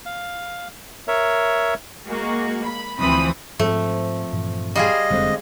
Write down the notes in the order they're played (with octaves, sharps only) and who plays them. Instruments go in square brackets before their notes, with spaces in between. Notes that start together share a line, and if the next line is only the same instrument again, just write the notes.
[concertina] F5
A#4 C#5 E5
[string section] G#3 A#3 F#4
B5
D2 E3 F3 C4 B5 D#6
[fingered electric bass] G#2 [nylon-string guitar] F3 C4 [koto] A3
[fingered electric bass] G2 A#2 E3
[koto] G3 F4 G#4 [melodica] D#5
[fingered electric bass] F1 [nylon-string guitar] D3 G#3 C4